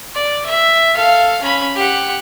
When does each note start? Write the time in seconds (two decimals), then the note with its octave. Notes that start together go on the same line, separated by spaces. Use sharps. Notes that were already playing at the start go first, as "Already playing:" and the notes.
0.15 D5
0.46 E5
0.95 A4 F5
1.42 C#4 B5
1.76 G4 F#5